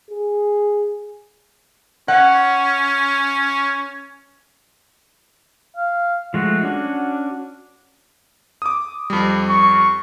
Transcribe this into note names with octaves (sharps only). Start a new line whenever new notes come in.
G#4
C#4 F#5
F5
F3 G#3 A3 F#4
C#4 D4 F#4
D6 D#6
F2 G3
C#6